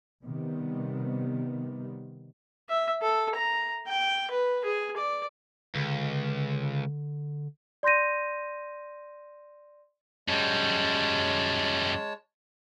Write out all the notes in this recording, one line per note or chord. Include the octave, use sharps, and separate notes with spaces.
C3 D#3 G3 B3
E5
A4
A#5
G5
B4
G#4
D5
C#2 D3
D5 C6 G6 A#6 D#7
F#2 G3 G#3 C#5 A5